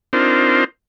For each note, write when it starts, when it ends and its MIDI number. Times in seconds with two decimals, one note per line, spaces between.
0.13 0.64 60
0.13 0.64 62
0.13 0.64 63
0.13 0.64 65
0.13 0.64 70
0.13 0.64 72